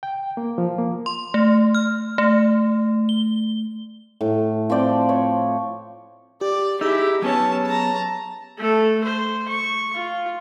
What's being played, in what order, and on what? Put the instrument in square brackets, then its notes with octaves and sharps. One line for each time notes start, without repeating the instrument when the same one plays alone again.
[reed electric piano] G5
A#3
F3
A#3
[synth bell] C6
A3
F6
A3
G7
[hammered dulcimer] A2
F3 C4 D5 G5
C#5
[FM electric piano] G4 [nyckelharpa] D5
[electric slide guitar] D#4 E4 [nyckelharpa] G4 [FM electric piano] G#4 E6
[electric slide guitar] F#3 B3 C#5 [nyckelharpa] C#4 A5
[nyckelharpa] A5 A#5
A3 A4
C5
C#6
F4